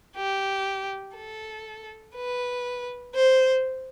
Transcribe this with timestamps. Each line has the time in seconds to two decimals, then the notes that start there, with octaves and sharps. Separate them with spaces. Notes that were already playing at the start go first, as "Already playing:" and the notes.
0.16 G4
1.16 A4
2.15 B4
3.15 C5